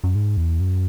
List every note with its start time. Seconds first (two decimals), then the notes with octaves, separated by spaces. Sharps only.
0.04 F#2
0.15 G#2
0.37 E2
0.60 F#2